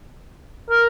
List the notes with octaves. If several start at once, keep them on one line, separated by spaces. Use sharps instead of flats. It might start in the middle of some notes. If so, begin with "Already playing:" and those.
A#4